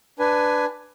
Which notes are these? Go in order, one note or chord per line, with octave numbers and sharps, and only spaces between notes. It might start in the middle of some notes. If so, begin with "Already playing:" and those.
D4 B4 G#5